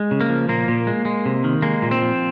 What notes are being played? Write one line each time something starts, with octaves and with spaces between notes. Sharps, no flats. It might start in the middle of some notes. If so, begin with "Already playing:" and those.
Already playing: G#3
C#3
A#3
F3
A#2 A#3
A#2
G#3
G#3
C3
D#3
G#3 A#3
A#2
C4
F3